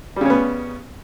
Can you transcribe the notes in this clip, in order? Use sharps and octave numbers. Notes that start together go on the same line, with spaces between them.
C#3 G3 B3 C#4